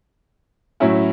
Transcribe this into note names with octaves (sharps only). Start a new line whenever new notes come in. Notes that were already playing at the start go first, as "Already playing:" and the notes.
A2 F#3 C#4 E4